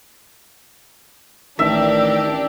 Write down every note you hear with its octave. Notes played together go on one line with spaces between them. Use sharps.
A1 D#3 D4 G4 E5